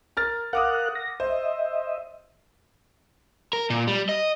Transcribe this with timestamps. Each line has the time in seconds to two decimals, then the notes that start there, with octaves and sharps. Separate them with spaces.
0.17 A#4 F6 A6
0.53 A#4 F5 F#5 D6 D#6 F#6
0.95 A#6
1.20 C5 D#5 E5
3.53 A#4
3.70 A#2
3.87 G3
4.09 D#5